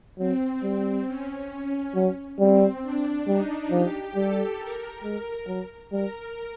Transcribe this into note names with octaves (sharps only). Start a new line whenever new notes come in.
F#3 C4
G3
C#4
C#4
F#3
G3 C4
D4
G3 D#4
F3 G4
G3 A4
A#4
G#3
F#3
G3 A#4